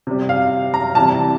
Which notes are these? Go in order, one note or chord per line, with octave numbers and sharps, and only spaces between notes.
C3 G3
F5
A#5
C3 E3 G3 A5